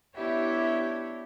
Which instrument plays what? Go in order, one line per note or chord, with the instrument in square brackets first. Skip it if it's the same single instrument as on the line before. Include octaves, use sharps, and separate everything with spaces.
[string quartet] B3 D4 E4 G4 C#5 E5